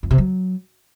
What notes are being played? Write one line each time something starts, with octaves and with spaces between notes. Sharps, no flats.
F2
C3
F#3